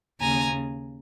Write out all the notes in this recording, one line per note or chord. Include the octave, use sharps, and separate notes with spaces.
D#2 C#3 G#5 A#5